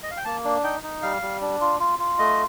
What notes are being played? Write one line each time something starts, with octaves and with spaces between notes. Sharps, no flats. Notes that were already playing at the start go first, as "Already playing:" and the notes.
D#5
F5
G5
A#3 A5
D4
D#4 G5
D#4
G3 F5
G3
D4
F4
F4
F4
A3 D#5